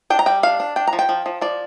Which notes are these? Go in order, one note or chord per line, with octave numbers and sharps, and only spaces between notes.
D4 G5
A#5
G3 G5
D4 F5
D4
D4 G5
A#5
F3
G5
F3
F3
F3 D5